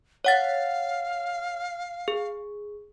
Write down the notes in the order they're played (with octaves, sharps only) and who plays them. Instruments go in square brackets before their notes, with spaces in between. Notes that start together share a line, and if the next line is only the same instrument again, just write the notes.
[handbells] C#5 F#5 A6 [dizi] F5
[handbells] G#4